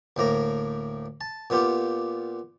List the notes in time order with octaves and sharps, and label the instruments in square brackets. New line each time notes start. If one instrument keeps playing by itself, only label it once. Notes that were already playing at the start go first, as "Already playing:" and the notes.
[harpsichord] D2 A2 A#3 A#5
A5
A#2 B3 F4 G4